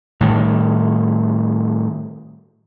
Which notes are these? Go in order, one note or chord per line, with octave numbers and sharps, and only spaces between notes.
A2 D#3 G3